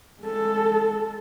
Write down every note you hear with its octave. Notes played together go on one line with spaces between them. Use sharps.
G#3 A4